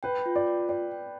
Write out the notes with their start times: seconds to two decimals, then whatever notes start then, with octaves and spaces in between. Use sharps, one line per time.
0.03 B4 G5
0.26 F4
0.36 D5
0.47 B4
0.69 D5 G5
0.91 G5